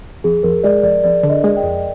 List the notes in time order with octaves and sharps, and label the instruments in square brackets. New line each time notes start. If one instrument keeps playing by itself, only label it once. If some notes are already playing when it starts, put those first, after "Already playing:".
[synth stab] F2 [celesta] G#4
[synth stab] F2 [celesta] A#4
[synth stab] G#3 [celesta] D5
[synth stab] F2 [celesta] D5
[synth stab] F2 [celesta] D5
[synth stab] D3
[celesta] D#5
[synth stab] G#3
[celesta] G5
[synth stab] F2